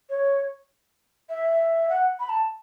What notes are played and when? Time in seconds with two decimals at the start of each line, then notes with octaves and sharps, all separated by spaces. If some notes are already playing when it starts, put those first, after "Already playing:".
0.10 C#5
1.29 E5
1.89 F#5
2.20 B5
2.29 A5